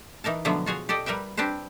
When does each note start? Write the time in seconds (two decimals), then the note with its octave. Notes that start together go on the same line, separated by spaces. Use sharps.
0.24 E3 D#4 A#4 A5
0.45 B2 D3 F3 F#3 A3 B3
0.66 F4 F#4 G#4 C#5
0.89 G4 A4 D5 D#5
1.06 G3 A#4 B4 E5 G5
1.37 C4 D4 G4 B4 C5